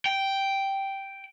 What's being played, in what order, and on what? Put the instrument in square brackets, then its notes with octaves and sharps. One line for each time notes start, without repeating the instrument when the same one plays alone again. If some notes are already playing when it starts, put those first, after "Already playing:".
[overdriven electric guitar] G5